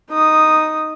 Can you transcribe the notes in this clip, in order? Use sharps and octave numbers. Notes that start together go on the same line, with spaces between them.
D#4 D#6